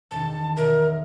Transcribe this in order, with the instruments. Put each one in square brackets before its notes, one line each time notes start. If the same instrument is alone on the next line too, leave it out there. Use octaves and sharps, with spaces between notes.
[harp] E1 D#3 [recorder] A5
[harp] B1 E5 [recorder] A#4